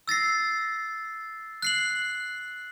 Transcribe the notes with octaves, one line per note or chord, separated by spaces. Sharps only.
E6 A6 A#6 C7
F#6 C7 F#7